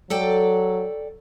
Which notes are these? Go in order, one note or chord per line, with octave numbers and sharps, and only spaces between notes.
F#3 A4 D5 G5